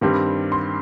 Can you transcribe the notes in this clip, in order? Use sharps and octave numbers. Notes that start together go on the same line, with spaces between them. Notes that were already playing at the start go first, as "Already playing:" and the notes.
G2 D#3 G3 C4
C6